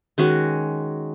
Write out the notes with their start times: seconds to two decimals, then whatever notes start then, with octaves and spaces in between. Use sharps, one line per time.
0.18 D#3 G#3 C#4 F#4